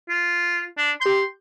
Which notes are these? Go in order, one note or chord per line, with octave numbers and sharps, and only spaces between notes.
F4
D4
G4 C6 G6